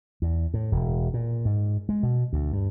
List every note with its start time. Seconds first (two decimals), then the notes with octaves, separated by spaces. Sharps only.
0.22 E2
0.54 A2
0.72 E1
1.14 A#2
1.45 G#2
1.89 G#3
2.03 B2
2.33 D2
2.53 G2